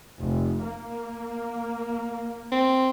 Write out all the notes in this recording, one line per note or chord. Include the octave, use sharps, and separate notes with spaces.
F1
A#3
C4